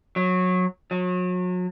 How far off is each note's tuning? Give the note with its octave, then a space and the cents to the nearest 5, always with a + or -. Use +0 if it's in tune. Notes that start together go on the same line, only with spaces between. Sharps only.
F#3 -20
F#3 -35